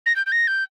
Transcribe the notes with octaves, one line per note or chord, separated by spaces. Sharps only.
A#6
G6
G6
A#6
G6